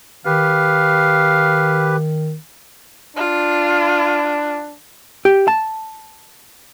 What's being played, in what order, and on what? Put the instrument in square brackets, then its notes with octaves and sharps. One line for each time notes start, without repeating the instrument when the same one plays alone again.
[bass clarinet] D#3 [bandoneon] G4 B4 [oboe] F5
[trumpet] D4 [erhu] F4
[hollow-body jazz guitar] G4
A5